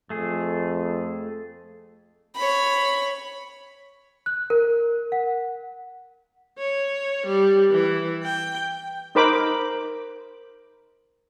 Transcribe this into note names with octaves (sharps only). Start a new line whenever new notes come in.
F2 A3 G#4
C#5 B5
F#6
A#4
F#5
C#5
G3
E3
G5
D#4 A#4 C5 B5 D6